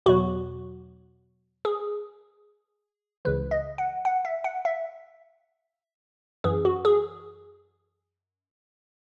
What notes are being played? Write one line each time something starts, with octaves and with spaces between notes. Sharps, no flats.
E2 B2 F#3 F#4
G#4
C#2 C#3 E3 B4
D#5
F#5
F#5
E5
F#5
E5
F#2 E3 G#4
F#4
G#4